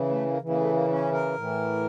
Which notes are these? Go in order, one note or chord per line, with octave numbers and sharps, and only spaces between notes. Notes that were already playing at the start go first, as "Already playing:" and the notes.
Already playing: C#3 E3
A3
A#3
C#3 E3
A#3
A3
A#3
C#4
A#4
A2 E3